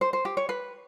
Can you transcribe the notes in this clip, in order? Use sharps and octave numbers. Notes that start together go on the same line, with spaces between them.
C5
C5
G4
C#5
B4